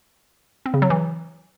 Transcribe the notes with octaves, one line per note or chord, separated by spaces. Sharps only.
C4
C#3
F#3
E3